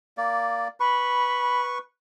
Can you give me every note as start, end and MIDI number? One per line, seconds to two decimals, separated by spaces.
0.17 0.68 58
0.17 0.68 74
0.80 1.78 71
0.80 1.65 83
0.80 1.78 85